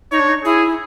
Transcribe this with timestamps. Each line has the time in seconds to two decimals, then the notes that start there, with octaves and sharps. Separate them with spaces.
0.11 D#4 C#5
0.19 D4
0.28 D#4
0.44 E4 G#4